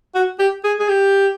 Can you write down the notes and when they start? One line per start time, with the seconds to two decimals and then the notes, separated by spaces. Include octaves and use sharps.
0.15 F#4
0.39 G4
0.64 G#4
0.80 G#4
0.89 G4